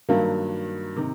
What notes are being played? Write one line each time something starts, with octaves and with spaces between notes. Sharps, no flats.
G2 D#3 F#3 A#3
C3 D#3